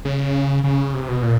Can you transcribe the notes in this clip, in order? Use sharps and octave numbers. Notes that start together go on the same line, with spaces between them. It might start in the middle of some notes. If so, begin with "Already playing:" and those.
C#3
C#3
C3
B2
A#2